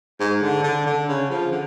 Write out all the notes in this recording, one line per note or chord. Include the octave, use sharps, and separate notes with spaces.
G#2
D3
D3
D3
C#3
F3
D3